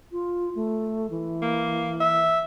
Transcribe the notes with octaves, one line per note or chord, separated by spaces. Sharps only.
F4
A3
E3
A#3
E5